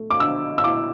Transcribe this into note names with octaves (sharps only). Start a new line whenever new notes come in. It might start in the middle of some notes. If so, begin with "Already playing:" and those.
Already playing: A3
D6
D3 E6
E6
E4 D6